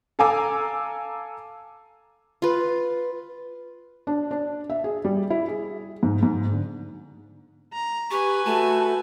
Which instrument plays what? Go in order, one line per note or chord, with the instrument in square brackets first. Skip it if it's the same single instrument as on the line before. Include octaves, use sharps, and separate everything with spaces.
[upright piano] A4 F5 G#5 A#5 D6 E6
[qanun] F4 B4
[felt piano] D4
D4
E5
G#4
G3
E4
G#4
G#2
G#2
D3
[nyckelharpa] A#5
[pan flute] G4 [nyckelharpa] B4 G#5 [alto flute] C#6
[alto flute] A3 [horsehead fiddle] F#4 [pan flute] A5